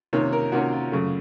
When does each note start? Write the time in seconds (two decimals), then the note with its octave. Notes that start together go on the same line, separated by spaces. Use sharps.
0.13 C3 D#3 A#3 C#4 C#5
0.33 A#4
0.52 C3 D#3 A#3 C#4 F#4
0.72 F4
0.92 F#2 C#3 A3